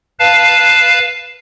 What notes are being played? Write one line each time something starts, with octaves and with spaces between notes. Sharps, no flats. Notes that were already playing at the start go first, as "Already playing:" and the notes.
B4 F5 A5